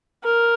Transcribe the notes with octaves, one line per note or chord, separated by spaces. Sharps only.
A#4